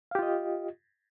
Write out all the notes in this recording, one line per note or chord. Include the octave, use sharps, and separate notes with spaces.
F4 G4 D#5 F5